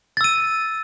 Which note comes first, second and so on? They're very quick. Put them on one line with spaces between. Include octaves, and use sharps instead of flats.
A6 E6 D#7